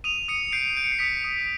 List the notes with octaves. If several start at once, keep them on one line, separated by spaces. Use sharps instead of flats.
D#6 D#7 F7
D#6 C#7 D#7
G6 C7 D7
G6 D7
C#7
C7
D#6 B6 C#7
D#6